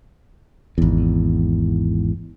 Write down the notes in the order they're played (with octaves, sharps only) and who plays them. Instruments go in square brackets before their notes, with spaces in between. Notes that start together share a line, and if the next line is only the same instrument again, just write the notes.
[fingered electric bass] G#1 E2